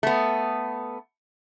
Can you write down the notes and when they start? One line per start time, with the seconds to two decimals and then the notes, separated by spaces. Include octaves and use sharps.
0.03 A3 B3